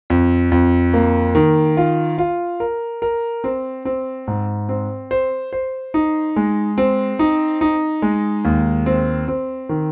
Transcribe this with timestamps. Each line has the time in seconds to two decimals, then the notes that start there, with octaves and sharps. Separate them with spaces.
0.10 F2
0.52 F2
0.94 A#3
1.35 D#3
1.77 F4
2.18 F4
2.60 A#4
3.02 A#4
3.44 C4
3.85 C4
4.27 G#2
4.69 C4
5.11 C5
5.53 C5
5.94 D#4
6.36 G#3
6.78 C4
7.19 D#4
7.61 D#4
8.02 G#3
8.45 D#2
8.86 C4
9.28 C4
9.69 D#3